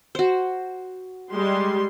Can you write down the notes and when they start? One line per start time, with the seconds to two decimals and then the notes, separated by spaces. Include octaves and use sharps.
0.15 F#4 C5
1.31 G3 G#3 C6